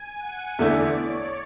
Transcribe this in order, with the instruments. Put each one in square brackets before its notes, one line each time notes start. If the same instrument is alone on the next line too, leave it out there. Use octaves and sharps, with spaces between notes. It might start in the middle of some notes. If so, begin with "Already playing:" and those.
Already playing: [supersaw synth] G#5
F#5
[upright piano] E2 D3 A3 E4 [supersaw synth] D5
[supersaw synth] C#5